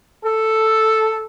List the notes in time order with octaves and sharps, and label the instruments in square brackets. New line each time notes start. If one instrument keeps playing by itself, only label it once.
[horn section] A4